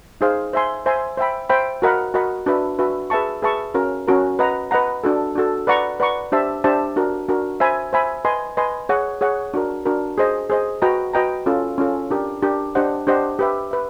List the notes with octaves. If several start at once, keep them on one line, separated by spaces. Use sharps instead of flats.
D#4 G#4 C5 F5
C5 E5 G#5 C6
C5 E5 G#5 C6
C5 E5 G5 B5
C5 E5 G5 B5
F#4 A#4 D#5 F#5 B5
F#4 A#4 D#5 F#5 B5
D4 F#4 B4 E5
D4 F#4 B4 E5
G#4 B4 E5 A5 C#6
G#4 B4 E5 A5 C#6
C#4 F#4 A#4
C#4 F#4 A#4
B4 D#5 F#5 A#5
B4 D#5 F#5 A#5
D4 F#4 A4
D4 F#4 A4
B4 D5 F#5 A#5 C#6
B4 D5 F#5 A#5 C#6
D4 G4 C5 E5 A5
D4 G4 C5 E5 A5
D4 F#4 A#4
D4 F#4 A#4
C5 E5 G#5 B5
C5 E5 G#5 B5
B4 D#5 G#5 C6
B4 D#5 G#5 C6
G#4 C#5 F#5
G#4 C#5 F#5
D4 F#4 A#4
D4 F#4 A#4
G#4 C5 D#5
G#4 C5 D#5
F#4 B4 D#5 G5 A#5
F#4 B4 D#5 G5 A#5
C#4 F4 A4
C#4 F4 A4
D4 G4 A#4
D4 G4 A#4
D4 G4 C5 D#5 F#5
D4 G4 C5 D#5 F#5
G4 B4 E5
B4 E5